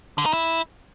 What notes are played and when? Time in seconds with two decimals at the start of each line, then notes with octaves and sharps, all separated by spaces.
0.18 D3
0.26 D#4
0.33 E4